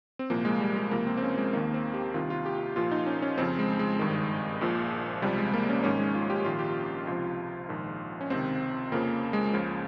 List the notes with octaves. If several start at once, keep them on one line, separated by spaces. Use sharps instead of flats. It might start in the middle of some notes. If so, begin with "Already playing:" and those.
C4
C2 A#2 F3 A#3
G#3
G3
G#3
C#2 C3 F3 A#3
C4
C4
C#4
G#3
D#2 D#3 A#3
C4
G4
C2 C3 D#3 F4
F4
G4
A#1 A#2 F3 F4
D#4
C#4
C#4
F2 C#3 F3 C4
G#3
G#3
G#1 G2 D#3
A#1 A#2 F3
C#2 C3 F3 G3
G#3
A#3
C#4
G#1 G#2 D#3 C#4
G#3
F4
G4
A#1 G#2 D#3 F4
G4
C#2 C3 F3 F4
A#1 G#2 D#3
C#4
C#2 C3 D#3 C4
F2 C#3 F3 A#3
G#3
C#2 C#3 F3